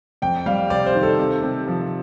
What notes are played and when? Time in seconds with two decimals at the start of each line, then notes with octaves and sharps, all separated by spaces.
0.22 F2 G5
0.46 G3 F5
0.70 C3 D5
0.86 C5
0.95 D#3
1.03 A4
1.19 C3
1.43 C3
1.67 F3